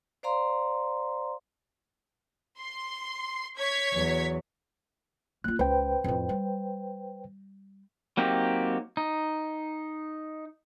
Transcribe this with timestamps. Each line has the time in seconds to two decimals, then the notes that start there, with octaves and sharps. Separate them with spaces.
0.23 C5 D5 F5 A#5 C6
2.59 C6
3.58 C#5 G#6 B6
3.93 E2 F#3
5.44 A#3 F4 F#6
5.59 C#2 B4 C5 G5
6.04 F2 A2
6.29 G3
8.17 F#3 A#3 C4 D#4 G4
8.97 D#4